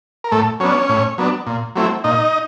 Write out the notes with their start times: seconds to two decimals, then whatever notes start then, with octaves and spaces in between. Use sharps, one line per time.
0.24 A#4
0.32 A2 A3 A4
0.60 F#3 B3 C#4 D4 C#5
0.89 A2
1.18 F#3 B3 D4
1.47 A#2
1.76 F#3 A3 C4 E4
2.04 A#2 D#4 D#5